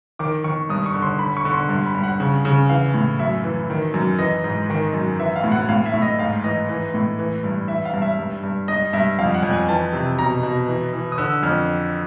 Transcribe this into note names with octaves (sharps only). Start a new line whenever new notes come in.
D#3 D6
D#3 C#6
G2 D#6
C#6
D3
C6
D3 B5
C#6
D3
C6
G2 C6
B5
G2
F#5
C#3
C#3
E3 F5
A2
F#2 E5
E3
D#3
F#2
E3 D#5
G#2
D#3
F#2
E3 E5
F5
A2
F#5
A2 F5
E5
A2
D#5
G#2 F5
E3 D#5
E3
A2
E3
G2
E3 E5
F5
G2
E5
G2
G2
G2 D#5
G2 E5
F2 F5
F#5
F2
G#5
E3 A5
C3
B2 A#5
B2
E3
E3
D#6
D3 E6
F2 F6